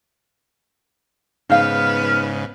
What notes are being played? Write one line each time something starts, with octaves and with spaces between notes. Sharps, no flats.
G#2 C#3 B3 D#4 B4 F5 F6